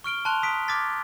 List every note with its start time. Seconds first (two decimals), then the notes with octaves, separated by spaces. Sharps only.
0.04 C#6 F6 D7 G7
0.25 A5 C6 F#6 F7 G7
0.42 A#5 D#6 B6 D7
0.68 D6 F6 G#6 A6 B6